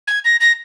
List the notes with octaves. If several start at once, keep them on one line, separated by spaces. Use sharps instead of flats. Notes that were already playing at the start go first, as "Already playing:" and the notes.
G#6
A#6
A#6